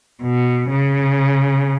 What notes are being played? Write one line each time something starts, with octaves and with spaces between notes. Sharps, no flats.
B2
C#3